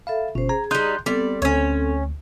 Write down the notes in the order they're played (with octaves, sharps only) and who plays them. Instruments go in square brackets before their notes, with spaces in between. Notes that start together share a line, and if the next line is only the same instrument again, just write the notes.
[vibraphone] A4 E5 B5 [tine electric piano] F5
[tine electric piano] G1 B2 [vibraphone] C#4 C5
[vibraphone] G#4 [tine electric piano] A#5
[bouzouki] G3 D#4 [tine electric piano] C6 F#6 G6
[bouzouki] G3 D5 [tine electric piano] B3 [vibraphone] C4 A4
[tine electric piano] D2 [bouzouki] C#4 C#5